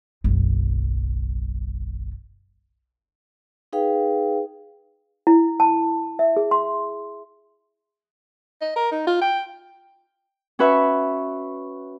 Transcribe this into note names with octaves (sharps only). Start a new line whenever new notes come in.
F#1 B1
D#4 G#4 B4 F5 G5
E4
A5
E5
G#4
C6
D#5
A#4
D#4
F4
G5
C#4 F#4 B4 E5 C#6